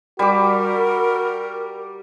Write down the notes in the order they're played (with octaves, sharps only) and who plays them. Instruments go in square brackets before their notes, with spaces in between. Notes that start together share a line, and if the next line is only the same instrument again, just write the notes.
[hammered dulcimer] G3 D6 [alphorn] F#4 [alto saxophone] A#4